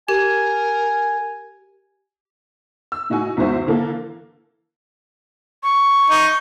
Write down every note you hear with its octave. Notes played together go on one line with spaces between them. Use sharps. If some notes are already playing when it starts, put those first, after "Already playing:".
G4 A#4 G#5
E6
A2 D#4 F#4 G#5
E2 G#2 F#4 C5 E5
D3 E3 A#3 A4
C#6
D#4